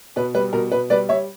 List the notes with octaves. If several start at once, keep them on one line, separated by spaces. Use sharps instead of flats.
B2 B4
G3 B4
B2 A#4
B2 B4
G3 B4 D5
G3 C#5 E5